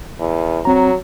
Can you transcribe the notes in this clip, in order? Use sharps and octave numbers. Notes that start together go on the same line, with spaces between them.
E2
F#3 C4 A#5